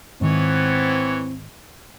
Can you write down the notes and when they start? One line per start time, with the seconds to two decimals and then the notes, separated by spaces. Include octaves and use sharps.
0.21 G#2 D#3 E3 B3 C4 C#5